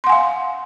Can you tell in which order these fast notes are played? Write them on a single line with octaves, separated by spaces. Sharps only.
C6 F#5 G#5 F5